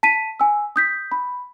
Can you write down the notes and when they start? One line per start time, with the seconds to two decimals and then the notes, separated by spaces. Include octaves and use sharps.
0.03 A5 B6 D#7
0.40 G#5 E6
0.76 D#6 G6 B6
1.12 B5